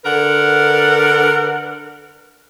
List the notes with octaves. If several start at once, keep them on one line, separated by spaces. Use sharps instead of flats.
D3 A#4 B4 F#5